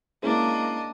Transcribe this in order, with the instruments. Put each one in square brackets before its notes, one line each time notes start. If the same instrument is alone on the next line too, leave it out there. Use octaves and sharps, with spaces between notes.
[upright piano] G#3 C#4 E4 [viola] A#3 [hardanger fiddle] D4 D#5